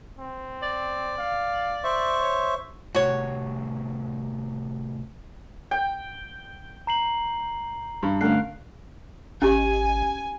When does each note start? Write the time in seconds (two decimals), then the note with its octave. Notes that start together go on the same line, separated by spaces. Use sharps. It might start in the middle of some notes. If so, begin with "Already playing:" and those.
0.19 C4
0.62 D5
1.18 F5
1.84 C5 E5 C#6
2.21 C#5
2.95 A2 C3 F#4 C#5
5.71 G5 G6
6.87 A#5 C7 F#7
8.03 G2
8.21 D3 A3 C#4 A#4 F5 F6 F#6 C7
9.42 G#1 C#4 G4 G#5